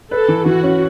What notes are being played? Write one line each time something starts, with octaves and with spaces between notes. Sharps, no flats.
A4 B4
E3
E3 F#4
C#4